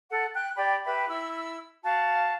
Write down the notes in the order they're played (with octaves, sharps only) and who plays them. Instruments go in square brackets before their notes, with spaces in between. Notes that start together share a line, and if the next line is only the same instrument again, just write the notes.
[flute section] A4 F#5
G5 F#6
G4 D5 G5 B5
G4 B4 E5 B5
E4 E6
F#4 F5 A5